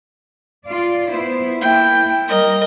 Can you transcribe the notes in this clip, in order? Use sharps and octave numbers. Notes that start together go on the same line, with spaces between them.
F4 D5
B3 E4 C5
A#3 E4 G5
G3 A#4 D#5